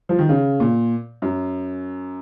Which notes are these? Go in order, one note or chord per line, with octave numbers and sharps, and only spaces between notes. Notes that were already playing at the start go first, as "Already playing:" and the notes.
F3
D#3
C#3
A#2
F#2